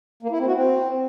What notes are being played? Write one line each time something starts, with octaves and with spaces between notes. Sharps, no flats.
A#3
E4
C4
F#4
C4